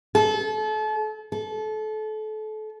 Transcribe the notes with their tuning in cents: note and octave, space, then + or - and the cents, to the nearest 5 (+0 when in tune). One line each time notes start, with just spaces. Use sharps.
A4 -35
A4 -30